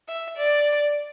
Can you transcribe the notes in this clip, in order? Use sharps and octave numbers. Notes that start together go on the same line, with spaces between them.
E5
D5